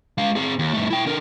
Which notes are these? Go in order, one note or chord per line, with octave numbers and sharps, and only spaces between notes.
G#3 F5
C4 G#4
D#2
G2 A3
E4 G5
D3 A#4